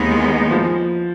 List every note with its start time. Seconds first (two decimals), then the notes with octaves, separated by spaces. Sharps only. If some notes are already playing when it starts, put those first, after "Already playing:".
Already playing: D#2 D#3 E3 G#3 B3 D#4
0.51 F3